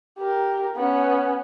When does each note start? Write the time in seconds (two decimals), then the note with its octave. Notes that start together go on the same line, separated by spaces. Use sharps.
0.18 G4 A#4
0.76 B3 C#4